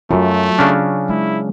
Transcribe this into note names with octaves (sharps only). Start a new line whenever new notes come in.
F#2 F#3 A3 F4
C#3 C#4 D4
G#3 E4